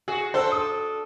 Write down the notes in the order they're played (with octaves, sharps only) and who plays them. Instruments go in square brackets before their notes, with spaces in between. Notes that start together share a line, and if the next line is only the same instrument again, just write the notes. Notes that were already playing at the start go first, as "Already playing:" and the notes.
[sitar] F#4 [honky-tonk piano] G#4
[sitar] D4 A4 [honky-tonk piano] C5
[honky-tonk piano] D#6